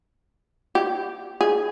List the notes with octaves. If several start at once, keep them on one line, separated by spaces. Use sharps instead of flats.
G4
G#4